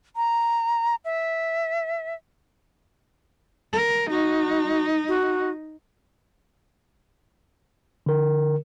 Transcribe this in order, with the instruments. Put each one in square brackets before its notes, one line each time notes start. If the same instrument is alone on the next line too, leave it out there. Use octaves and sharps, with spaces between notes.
[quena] A#5
E5
[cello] A#4
[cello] D#4 [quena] F#4
[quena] F#4
[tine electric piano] D3 A#4